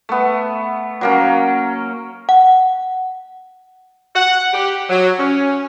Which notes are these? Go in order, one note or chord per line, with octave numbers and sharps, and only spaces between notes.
A3 B3
F#3 A#3 C#4
F#5
F#5
G4
F#3
C#4